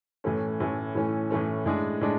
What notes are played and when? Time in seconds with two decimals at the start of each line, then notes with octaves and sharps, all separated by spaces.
0.24 A2 E3 A3 C#4
0.60 A2 E3 A3 C#4
0.95 A2 E3 A3 C#4
1.30 A2 E3 A3 C#4
1.66 A2 G#3 D4 G#4
2.01 A2 G#3 D4